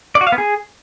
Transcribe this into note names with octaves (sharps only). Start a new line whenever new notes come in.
D5
F#4
F5
B3
G#4